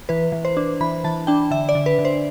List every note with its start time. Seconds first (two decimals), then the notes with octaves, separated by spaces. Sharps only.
0.09 E3 B4
0.32 E3
0.45 C5
0.57 D4
0.81 E3 B5
1.04 E3 A5
1.27 D4 G5
1.51 D3 E5
1.69 D5
1.75 D3
1.86 B4
1.98 D3
2.05 C5